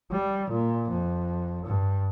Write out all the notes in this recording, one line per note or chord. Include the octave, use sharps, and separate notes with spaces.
G3
A#2
F2
G2